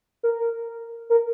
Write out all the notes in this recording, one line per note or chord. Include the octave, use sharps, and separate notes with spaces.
A#4
A#4